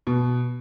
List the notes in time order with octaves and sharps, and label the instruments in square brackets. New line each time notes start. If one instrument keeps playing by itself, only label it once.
[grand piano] B2